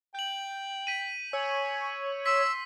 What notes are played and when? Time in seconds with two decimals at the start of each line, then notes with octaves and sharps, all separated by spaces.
0.15 G5 G6 F#7
0.87 B6 D#7
1.33 C#5 G#5 E6
2.26 C6 E6 B6